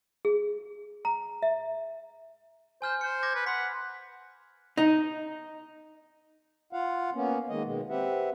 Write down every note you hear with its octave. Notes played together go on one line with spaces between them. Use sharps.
G#4
A#5
E5
C5 G#5 F6 G6
C5 C#7
D6 G#6 A#6
B4
F#5 B5 C6 B6
D#4
F4 F5 F#5
A#3 B3 C#4
D#3 G#3 A#3 D#5
B2 D#3 G#3
C4 G4 B4 E5 F#5